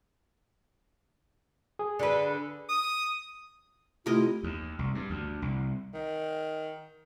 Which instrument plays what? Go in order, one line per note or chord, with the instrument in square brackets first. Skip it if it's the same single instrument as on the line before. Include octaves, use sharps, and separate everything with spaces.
[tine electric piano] G#4
[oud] D3 B4
[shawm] D#6
[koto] C3 A#4 D#5 [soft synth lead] A3 [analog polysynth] E4 [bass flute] F4
[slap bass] D#2
C2
G2
D2
C2
[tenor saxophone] D#3